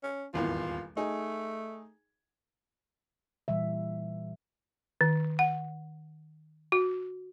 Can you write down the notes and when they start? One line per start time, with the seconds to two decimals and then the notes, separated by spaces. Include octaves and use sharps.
0.03 C#4
0.34 D#1 G#1 E2 F4
0.97 A3 D#4 G#4
3.48 A#2 E3 G3 E5
5.01 D#3
5.39 F#5
6.72 F#4